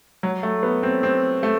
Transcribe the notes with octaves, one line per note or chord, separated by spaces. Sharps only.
F#3
A3
B3
C4
C4
A3